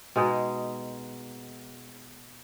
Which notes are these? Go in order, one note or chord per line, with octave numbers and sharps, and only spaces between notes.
B2 G#3 D#4 G#4